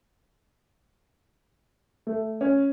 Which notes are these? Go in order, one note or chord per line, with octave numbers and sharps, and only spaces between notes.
A3
C#4